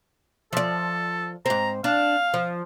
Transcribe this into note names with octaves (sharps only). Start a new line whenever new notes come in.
F3 A4 D5
G#2 C4 A#5
D4 F5
F3